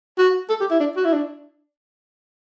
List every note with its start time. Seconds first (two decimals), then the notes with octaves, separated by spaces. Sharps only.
0.18 F#4
0.49 A4
0.60 G4
0.71 E4
0.80 D4
0.96 F#4
1.05 E4
1.13 D4